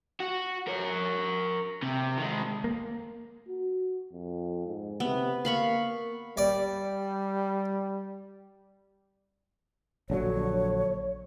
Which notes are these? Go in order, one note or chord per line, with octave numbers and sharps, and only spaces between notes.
F#4
A#4 C#5
C3
D#3 G#3
A#3
F#4
F2
G#2
C3 B3
A#3 F5 B5 C#6
G3 D5
A#1 D3 F#3 C#5